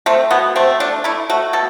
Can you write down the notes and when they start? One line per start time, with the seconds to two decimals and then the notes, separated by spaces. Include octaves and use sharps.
0.06 A3 C4
0.31 B2 B3
0.56 A3 C4
0.80 A3 D4
1.04 A3 E4
1.30 A3 F#4
1.53 B2 A4